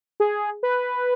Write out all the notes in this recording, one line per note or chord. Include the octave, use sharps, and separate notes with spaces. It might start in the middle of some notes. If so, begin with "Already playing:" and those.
G#4
B4